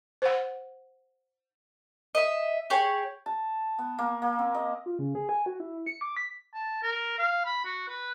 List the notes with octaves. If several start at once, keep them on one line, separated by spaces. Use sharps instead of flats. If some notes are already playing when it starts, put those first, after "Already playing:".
C5 F#5
D#5 E5
G4 G#4 C#5
A5
B3
A#3
A#3
C4
D#5
F4
C#3
G#4
G#5
F#4
E4
C#7
D6
B6
A5
A#4
F5
B5
F#4
B4